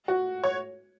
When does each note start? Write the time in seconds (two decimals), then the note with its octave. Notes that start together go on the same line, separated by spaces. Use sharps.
0.08 F#4
0.44 C#5